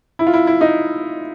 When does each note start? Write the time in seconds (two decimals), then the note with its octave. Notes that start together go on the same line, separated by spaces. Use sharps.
0.19 E4
0.27 F4
0.34 E4
0.47 E4
0.61 D#4